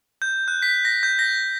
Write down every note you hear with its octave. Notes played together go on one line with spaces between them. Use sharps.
G6
F#6
B6
A#6
G6
A#6